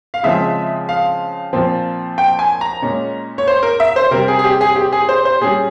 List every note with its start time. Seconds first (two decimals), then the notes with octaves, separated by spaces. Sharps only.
0.14 F5
0.23 C#3 F3 G#3 C4 E5
0.89 F5
1.53 A#2 F3 C4
2.18 G5
2.39 G#5
2.61 A#5
2.82 A#2 G#3 C#4
3.38 C#5
3.48 C5
3.63 A#4
3.80 E5
3.96 C5
4.11 C3 G3 C4 A#4
4.28 G#4
4.39 G#4
4.44 G4
4.61 G#4
4.76 G4
4.92 G#4
5.09 C5
5.25 C5
5.41 A#2 G3 C#4 G#4